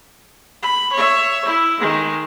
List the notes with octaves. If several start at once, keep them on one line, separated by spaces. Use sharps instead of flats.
B5
C#5 E5
E4
D#3 G#3